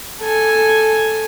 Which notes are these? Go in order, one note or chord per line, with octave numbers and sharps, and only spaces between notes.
A4 G#5